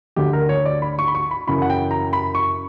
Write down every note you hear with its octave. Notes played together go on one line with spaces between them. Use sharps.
D2 D3 G4
A#4
C#5
D5
B5
C#6
B5
C#6
B5
F#2 C#3 E3 B5
F#5
G5
A#5
B5
C#6